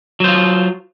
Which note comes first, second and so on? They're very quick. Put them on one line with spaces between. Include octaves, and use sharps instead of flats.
F#3 C5 F4